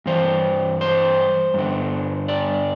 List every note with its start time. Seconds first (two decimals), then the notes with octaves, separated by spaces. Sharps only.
0.06 G2 E3 C5
0.81 C5
1.54 G2 D3
2.28 D5